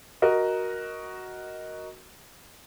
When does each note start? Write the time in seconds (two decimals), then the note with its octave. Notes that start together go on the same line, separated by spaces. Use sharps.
0.22 F#4 A#4 D#5